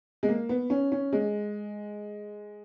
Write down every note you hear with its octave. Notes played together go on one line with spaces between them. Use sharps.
G#3
A#3
B3
C#4
C#4
G#3